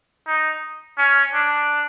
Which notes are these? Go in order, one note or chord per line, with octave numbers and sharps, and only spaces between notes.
D#4
C#4
D4